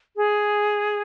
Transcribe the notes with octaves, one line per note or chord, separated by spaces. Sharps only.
G#4